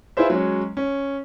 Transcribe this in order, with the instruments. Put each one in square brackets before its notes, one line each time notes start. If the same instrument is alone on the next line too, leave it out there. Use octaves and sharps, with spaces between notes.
[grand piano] E4 F4 G#4 B4 C5 E5
F#3 G#3 C#4
C#4